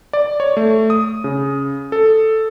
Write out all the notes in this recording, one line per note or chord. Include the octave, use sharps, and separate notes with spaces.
D5
C#5
A3
D#6
C#3
A4